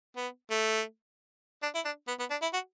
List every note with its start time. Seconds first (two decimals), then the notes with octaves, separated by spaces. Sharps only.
0.17 B3
0.51 A3
1.63 D4
1.75 E4
1.85 D4
2.08 B3
2.19 B3
2.31 D4
2.42 E4
2.53 F#4